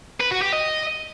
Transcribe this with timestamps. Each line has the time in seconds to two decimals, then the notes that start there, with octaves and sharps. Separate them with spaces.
0.21 B4
0.31 F#4
0.42 G4
0.53 D#5